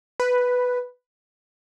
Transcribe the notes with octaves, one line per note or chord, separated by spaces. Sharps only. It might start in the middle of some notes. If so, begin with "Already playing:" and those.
B4